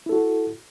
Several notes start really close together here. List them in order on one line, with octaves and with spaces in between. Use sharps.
E4 A4 F#4